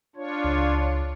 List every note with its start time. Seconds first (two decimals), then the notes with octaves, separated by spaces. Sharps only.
0.16 D4 F4 C#5
0.44 C#2